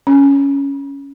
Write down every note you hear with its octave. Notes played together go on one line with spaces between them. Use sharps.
C#4